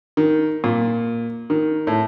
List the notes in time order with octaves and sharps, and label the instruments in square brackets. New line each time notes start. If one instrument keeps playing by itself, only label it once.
[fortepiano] D#3
A#2
D#3
A2